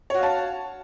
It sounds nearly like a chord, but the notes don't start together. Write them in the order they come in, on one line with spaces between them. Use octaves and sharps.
C#5 F#4 F5 A5